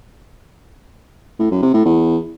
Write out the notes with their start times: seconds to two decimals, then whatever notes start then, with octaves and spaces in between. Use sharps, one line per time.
1.40 A2
1.51 F#2
1.62 C3
1.74 A2
1.85 E2